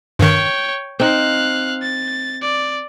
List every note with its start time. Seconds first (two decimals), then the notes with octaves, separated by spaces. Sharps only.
0.19 G2 D#3 C#5 G5
1.00 C4 D#4 F5 F#6
1.82 A6
2.41 D5